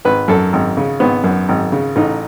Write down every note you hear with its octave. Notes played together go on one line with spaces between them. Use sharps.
G#1 B4
F#2 A4
G#1
C#3
G#1 B3
F#2
G#1
C#3
A1 D#4